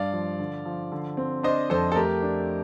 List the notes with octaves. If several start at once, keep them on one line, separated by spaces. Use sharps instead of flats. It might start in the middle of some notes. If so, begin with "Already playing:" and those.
Already playing: G2 D5 F5
F3
D3
F3
D3
C4
D4 C5 D#5
F2 A4 C5
A4
A3 G4 A#4
D4